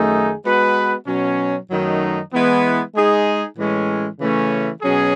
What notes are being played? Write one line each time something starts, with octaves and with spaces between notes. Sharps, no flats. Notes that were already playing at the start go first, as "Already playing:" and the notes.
Already playing: F#2 D#3 A3 D#4 G#4
G#3 B3 F#4 B4
B2 F#3 C#4
F#2 D#3 F#3 A3 D#4
E3 G#3 B3 E4 B4
G#3 D#4 G#4
A2 E3 G#3 C#4
C#3 E3 A3 C#4
B2 F#3 C#4 G#4